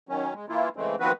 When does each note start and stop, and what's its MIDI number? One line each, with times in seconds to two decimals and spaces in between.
0.09 0.34 51
0.09 0.34 54
0.09 0.34 61
0.35 0.46 56
0.49 0.69 52
0.49 0.69 58
0.49 0.69 64
0.49 0.69 65
0.76 0.96 49
0.76 0.96 52
0.76 0.96 56
0.76 0.96 57
0.76 0.96 60
1.00 1.12 51
1.00 1.12 53
1.00 1.12 59
1.00 1.12 60
1.00 1.12 66
1.00 1.12 71